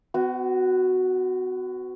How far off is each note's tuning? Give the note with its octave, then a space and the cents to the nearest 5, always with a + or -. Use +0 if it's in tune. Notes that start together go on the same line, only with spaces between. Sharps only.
B3 +40 F#4 +0